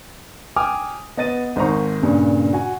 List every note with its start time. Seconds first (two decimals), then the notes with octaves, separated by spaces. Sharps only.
0.56 G5 G#5 D6 D#6 F6
1.17 B3 D#5 A6 D#7
1.56 G#1 G#2 A#4 C5 A#5 C#6
2.02 G2 A#2 C#3
2.53 F#4 G#5